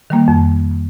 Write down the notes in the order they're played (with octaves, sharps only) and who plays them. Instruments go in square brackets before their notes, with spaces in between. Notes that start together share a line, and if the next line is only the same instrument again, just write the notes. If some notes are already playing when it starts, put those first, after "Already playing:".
[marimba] D#3 G3 A#3
F2